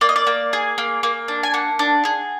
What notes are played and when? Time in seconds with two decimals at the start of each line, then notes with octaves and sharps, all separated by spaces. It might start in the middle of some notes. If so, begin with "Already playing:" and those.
0.01 A#3 D5
0.09 D#5
0.16 D5
0.27 A#3
0.53 G#4
0.78 A#3
1.03 A#3
1.28 D4
1.43 G#5
1.54 A#3 F#5
1.79 D4
2.05 G#4